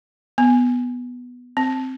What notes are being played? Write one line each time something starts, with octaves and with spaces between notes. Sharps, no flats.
B3
C4